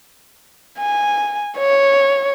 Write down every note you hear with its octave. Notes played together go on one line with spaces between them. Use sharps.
G#5
C#5